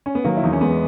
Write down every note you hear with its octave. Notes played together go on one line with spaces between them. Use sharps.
C#4
B3
D#3 F#3 A#3
E4
E2 D#4
C#4
E2 G#3 B3